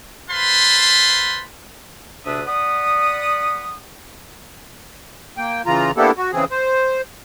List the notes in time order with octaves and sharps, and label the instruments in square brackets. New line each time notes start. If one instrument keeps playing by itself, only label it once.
[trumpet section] B4 C5 F5 A5 B5 C6
[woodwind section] D2 C3 D4 B4 E5 D#6
D5 F#5 B5 D#6
[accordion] A#3 G5
C#3 E3 F4 A#5
A#3 B3 D4 E4 G4 A4
F#4
C#3 E3 C4 G#4
C5